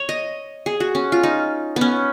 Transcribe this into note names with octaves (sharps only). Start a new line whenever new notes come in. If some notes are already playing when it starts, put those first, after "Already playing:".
Already playing: C#5
D#5
G#4
F#4
C#4
F4
D#4
B3 C#4